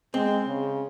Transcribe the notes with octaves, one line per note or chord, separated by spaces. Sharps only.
G#3 C4
C#3